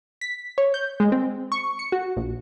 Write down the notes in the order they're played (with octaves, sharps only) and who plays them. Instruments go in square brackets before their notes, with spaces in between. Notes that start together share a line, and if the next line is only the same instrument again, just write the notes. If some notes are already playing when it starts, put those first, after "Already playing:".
[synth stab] B6
C#5
G6
G#3
C4
C#6
C#7
F#4
A#1